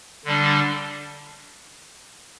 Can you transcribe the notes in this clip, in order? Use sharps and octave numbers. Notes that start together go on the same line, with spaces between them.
D3 G3 D4